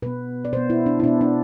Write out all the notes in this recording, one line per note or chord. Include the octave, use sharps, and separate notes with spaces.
B2 B3 B4
D5
B2 B3 C5
E4
D4
E4
B2 B3 D4
D4